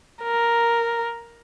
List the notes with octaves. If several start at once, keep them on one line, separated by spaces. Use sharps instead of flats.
A#4